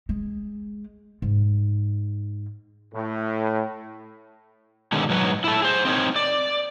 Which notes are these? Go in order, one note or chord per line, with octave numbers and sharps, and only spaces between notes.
G#3
G#2
A2
B2 D3 D#3 G#3 C#4
G#2 F#3 B4 C#5
E4 A4
G#4 C5
C4 D#4 A#4 C#5
D5